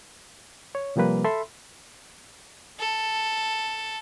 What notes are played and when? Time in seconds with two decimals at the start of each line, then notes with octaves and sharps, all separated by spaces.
0.75 C#5
0.96 C3 F3 G3 A#3 B4
1.24 A4 E5 B5 C6
2.79 A4